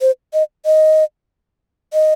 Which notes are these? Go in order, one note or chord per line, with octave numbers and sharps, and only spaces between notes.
C5
D#5
D#5
D#5